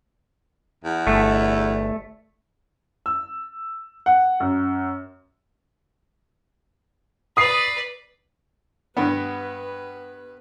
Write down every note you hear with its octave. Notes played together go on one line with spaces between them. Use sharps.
E2
G1 A3
E6
F#5
F#2
B4 D5 D#6 C7
G2 B3 B4